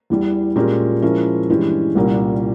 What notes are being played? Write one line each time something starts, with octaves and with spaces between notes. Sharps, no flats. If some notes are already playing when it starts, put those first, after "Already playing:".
E2 E3 G3
A#2 G#3 C#4 G4 A#4
F3 G#3 C#4 E4 A#4
G2 E3 G#3 C#4 G4
C2 A#2 G3 A#3 C#4